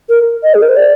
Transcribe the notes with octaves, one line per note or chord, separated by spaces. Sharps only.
A#4
D#5
G#4
A#4
C5
D5